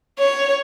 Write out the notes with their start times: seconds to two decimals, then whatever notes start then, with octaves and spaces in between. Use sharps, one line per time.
0.19 C#5